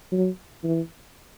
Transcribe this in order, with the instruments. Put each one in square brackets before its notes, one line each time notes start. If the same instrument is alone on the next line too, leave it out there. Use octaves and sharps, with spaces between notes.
[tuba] F#3
E3